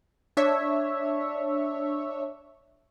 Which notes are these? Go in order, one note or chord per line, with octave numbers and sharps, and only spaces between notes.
D4 C#5 E5